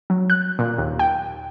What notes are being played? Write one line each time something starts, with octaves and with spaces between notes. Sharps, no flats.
F#3
F#6
A#2
D#2
G5